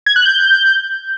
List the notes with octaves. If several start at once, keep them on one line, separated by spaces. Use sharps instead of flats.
G#6
F#6
G6